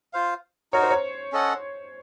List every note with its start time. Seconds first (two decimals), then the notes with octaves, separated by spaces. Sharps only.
0.13 F4 C5 F5
0.73 D#4 F#4 A#4 C#5
0.83 C5
0.91 C#5
1.32 C#4 A4 D#5 F#5